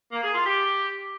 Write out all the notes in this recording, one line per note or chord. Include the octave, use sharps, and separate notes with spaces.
A#3
G#4
F4
G4